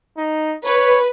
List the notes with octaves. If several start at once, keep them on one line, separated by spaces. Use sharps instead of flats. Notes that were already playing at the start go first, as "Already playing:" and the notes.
D#4
B4 C#5